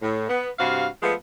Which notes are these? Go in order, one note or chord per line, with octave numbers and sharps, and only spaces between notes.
A2
B3
G2 C3 F#4 F5
F3 G#3 A3 B3